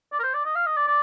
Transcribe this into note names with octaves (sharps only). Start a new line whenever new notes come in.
D5
A#4
C5
D5
D#5
F5
D#5
D5
D5